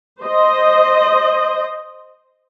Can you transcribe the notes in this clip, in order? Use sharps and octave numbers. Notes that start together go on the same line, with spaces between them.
C5 D#5